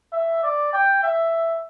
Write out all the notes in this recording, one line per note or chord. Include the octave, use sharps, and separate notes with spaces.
E5
D5
G5
E5